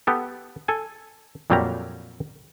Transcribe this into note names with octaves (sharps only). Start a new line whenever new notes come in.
B3 G4 A4
A4 G#5
F2 A#2 F#3 G3 G4 A#5